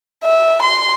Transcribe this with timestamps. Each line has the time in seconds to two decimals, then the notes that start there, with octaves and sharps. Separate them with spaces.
0.24 E5
0.62 C6